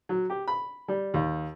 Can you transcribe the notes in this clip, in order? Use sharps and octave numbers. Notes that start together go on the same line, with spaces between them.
F#3
G4
B5
G3
D#2